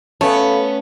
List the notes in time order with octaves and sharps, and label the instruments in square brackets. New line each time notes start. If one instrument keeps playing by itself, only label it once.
[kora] A3 [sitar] B3 C#4 [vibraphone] A4 F5 B5